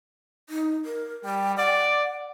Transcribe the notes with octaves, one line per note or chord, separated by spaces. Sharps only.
D#4
A#4
G3 G5
D5 F#5